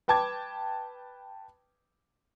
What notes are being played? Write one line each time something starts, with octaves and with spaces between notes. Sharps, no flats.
B4 G5 A5 D6 G#6